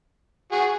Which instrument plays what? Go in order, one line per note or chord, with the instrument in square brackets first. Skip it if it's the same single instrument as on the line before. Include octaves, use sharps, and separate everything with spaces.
[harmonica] F#4 G#4